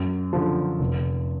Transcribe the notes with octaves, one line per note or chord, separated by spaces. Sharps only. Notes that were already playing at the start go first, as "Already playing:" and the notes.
Already playing: F#2
D3 F3
F1